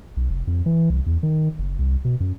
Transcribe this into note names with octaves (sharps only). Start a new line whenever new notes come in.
B1
F1
F2
E3
C2
E2
D#3
F#1
C2
B2
F#2